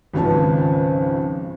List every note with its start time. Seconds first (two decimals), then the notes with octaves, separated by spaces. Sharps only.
0.13 G#1 C#2 F3 C#4 B4 A5